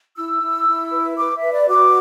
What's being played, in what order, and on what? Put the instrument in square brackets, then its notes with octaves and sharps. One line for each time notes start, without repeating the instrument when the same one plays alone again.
[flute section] E4 E6
E4
E4
B4
B4 D6
E5
B4
D5
F#4 D6